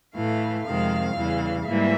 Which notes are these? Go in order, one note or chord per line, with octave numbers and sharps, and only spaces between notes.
A2 E3 A3 F5
F2 C3 D#3 G#3 F5
E2 C#3 E3 G3
G#2 E3 G3 A#3 E5